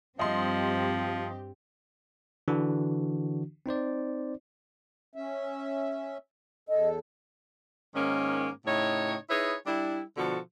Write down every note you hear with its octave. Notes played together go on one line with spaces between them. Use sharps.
G2 F3 C4 G4 D#5 C6
D3 E3 D4 F#4
C4 D#4 C5 D5
C#4 E5
E2 A4 D#5
G#2 D#3 A#3 C#4
A2 C#3 D#4 C#5
D#4 E4 G#4 B4 C#5
G3 D4 E4
B2 D3 F3 F#4 A4